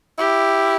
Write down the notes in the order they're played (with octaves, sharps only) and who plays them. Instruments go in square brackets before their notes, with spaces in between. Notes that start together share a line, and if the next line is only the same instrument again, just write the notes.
[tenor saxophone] E4 [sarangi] G4